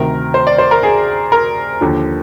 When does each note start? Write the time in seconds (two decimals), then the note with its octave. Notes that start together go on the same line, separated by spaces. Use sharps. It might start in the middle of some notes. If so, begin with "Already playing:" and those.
Already playing: D2 C3 D#3 A#4
0.34 C5
0.47 D5
0.58 C5
0.71 A#4
0.83 G#4
1.32 A#4
1.81 D#2 D3 F3